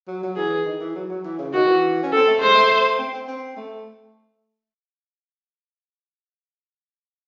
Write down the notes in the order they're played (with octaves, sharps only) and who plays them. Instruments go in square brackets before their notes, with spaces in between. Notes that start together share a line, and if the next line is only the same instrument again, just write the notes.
[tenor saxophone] F#3
F#3
[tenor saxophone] E3 [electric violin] G#4
[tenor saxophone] D#3
E3
F#3
F#3
E3
C#3
[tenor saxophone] D#3 [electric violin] F#4
[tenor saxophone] E3
C#4
[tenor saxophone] C4 [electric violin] A4
[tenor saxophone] A3
[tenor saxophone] G#3 [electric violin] C5
[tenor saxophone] A3
C4
C4
C4
A3